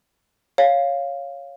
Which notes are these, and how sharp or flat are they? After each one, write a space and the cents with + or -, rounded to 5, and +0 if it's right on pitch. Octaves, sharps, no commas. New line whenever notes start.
C#5 +0 F5 +0